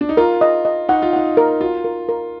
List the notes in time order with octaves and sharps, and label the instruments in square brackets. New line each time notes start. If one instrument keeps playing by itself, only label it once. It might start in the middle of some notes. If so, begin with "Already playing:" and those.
[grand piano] D4
D#4
[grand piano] F4 [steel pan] A#4
[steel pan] D#5
D#5
[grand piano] D#4 [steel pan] F#5
[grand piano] F4
[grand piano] D#4 [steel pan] F#5
[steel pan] A#4
[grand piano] F4 [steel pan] F#4
[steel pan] A#4
A#4